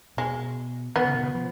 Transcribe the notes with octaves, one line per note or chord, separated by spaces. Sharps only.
B2 G#3
D#3 B3
C#3
B2
C#3
F3